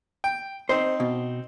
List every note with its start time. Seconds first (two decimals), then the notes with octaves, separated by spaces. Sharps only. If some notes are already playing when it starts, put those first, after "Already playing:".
0.24 G5
0.69 C4 D#4 C5
1.00 B2